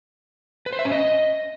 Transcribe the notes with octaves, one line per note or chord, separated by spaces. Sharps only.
B4
C5
E5
C#4
D#5